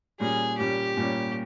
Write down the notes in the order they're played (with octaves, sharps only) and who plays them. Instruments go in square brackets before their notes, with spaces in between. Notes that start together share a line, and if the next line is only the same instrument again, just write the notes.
[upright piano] A#2 G3 C#4 [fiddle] G#4
[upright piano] A#2 G3 C#4 [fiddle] G4
[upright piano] A#2 G3 C#4